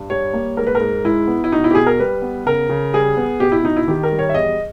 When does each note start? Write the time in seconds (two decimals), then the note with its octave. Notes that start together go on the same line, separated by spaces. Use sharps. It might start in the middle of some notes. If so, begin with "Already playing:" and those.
Already playing: G2
0.10 G3 C#5
0.34 A#3
0.57 G#2 A#4
0.67 B4
0.75 A#4
0.80 G#2
1.04 G#3 E4
1.27 B3
1.44 E4
1.52 B2 D#4
1.64 E4
1.71 G4
1.75 B2 G#4
1.86 A#4
2.00 G3 B4
2.22 B3
2.46 C#3 A#4
2.69 C#3
2.94 G3 G#4
3.17 B3
3.40 B2 G4
3.52 E4
3.64 B2 D#4
3.77 E4
3.88 D#3 G4
4.03 A#4
4.12 G3
4.19 C#5
4.29 E5
4.34 E2 D#5